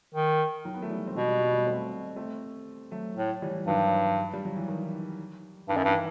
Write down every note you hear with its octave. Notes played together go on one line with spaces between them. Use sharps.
D#3
D#3 F#3
B3
A3
E3 G3
C4
B2 G3 B3
G3 B3
G3 B3
G3 B3
A3 C4
A3 C4
F#3 A3
A2
E3 G3
G2 D#3 F#3
G3
F#3
E3
D#3
G2 D#3
F#2
G2 E3